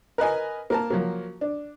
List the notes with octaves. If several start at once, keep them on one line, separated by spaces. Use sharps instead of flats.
A#4 B4 D#5 G#5
A#3 A#4 A5
F3 F#3 A#3
D4